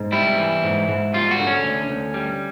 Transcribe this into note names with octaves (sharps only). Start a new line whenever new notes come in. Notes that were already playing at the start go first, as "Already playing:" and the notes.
Already playing: G#2
G3 E4
E3
G#2
G#2
G3 F4
F#4
D3
C#4
D2
D2
G3